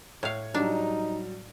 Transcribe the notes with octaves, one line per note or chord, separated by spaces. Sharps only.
A2 C#5 F5
F#3 G3 D4 D#4